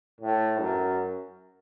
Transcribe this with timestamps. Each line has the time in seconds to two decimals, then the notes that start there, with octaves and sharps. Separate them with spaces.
0.21 A2
0.60 F#2